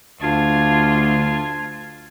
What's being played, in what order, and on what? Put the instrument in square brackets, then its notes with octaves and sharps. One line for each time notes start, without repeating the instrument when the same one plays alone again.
[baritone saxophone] D2 [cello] F4 [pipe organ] A5 G#6